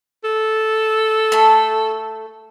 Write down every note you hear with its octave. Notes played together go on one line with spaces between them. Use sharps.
A4
A3 A5